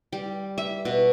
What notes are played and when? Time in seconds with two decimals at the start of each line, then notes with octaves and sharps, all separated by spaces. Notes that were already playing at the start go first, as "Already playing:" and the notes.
0.13 G3
0.58 E5
0.85 B2